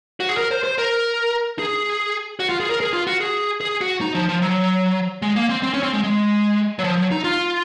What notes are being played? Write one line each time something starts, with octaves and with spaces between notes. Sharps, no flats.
F#4
G#4
A#4
C5
C5
A#4
G#4
F#4
F4
G#4
A#4
G#4
F4
F#4
G#4
G#4
F#4
D#4
F3
F3
F#3
G#3
A#3
C4
C4
C#4
C4
G#3
G#3
F#3
F3
F#3
D#4
F4